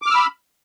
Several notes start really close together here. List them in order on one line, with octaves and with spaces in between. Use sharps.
D6 F6 E6 B5